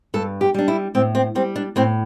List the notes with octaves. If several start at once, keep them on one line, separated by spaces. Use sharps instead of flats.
G2 A4
G4
G3 D4
E4
A2 C4
C4
G3 C4
D4
A2 C4